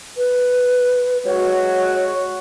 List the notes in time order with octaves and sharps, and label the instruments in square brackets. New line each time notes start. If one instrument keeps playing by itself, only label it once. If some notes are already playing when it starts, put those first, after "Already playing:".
[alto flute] B4
[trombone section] G#3 F#4 [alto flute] C#5